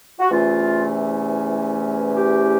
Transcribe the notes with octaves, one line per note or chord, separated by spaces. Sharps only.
F#4
E2 C3 E3 A3 C#4 F4
G4